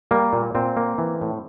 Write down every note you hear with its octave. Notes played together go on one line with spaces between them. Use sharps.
G3 A#3
A#2
A#2 C4
A#3
E3
A2